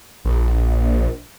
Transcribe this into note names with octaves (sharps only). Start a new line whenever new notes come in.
A#1